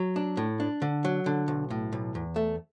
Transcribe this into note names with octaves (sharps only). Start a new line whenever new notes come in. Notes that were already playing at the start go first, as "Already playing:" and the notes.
Already playing: F#3
D4
A2
D4
D3
F#3
D3
B1
A2
B1
E2
A3